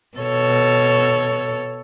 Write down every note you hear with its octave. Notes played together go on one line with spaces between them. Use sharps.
B2 A4 C#5